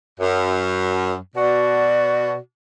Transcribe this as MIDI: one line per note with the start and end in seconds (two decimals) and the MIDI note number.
0.20 1.15 42
1.36 2.38 47
1.36 2.38 66
1.36 2.33 74